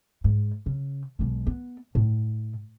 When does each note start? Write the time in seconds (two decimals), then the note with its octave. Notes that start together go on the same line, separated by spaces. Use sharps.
0.24 G#2
0.66 C#3
1.19 B1 G#3
1.47 B3
1.95 A2